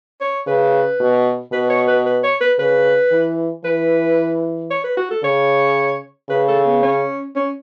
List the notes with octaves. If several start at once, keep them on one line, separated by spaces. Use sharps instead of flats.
C#5
C#3 B4
B2
B2 B4
C#5
B4
B4
C#5
B4
C#3 B4
E3
E3 B4
C#5
B4
F#4
A4
C#3 C#5
C#3 B4
A4
B3
C#4
C#4